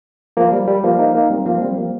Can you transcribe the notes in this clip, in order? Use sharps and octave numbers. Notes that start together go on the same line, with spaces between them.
F3 A#3
G3
G3
F3 A#3
A#3 D#4
A#3 D#4
G3 C4
F3 A#3
G3 C4
F3 A#3